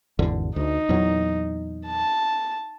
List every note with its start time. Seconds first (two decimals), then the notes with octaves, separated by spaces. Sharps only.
0.19 G#1 E2 D3
0.56 D2 D#4
0.89 E2 A#2 F#3
1.86 A5